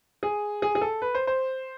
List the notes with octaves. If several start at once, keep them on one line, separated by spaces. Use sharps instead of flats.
G#4
G#4
G#4
A4
B4
C5
C5